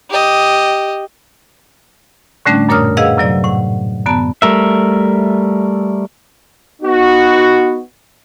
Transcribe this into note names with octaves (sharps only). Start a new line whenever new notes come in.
G4 D#5
A2 D3 G3 A3 C#4 D4
F#2 A#2 A#4 C#5 D#6 F6
G#4 B4 D#5 F5 F#5 E6
F#2 C3 F#3 D5
A2 F#5
F#2 D3 B3 A5 A#5
G3 A3 A#4 E5
B3 D#4 F#4